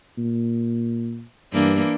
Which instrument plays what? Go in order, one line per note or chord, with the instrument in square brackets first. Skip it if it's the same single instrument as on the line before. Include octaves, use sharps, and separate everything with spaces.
[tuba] A#2
[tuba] G2 [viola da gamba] E3 A#3 D4